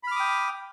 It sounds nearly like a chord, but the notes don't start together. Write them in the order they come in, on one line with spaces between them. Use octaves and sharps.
B5 F6 D6 D#6 G5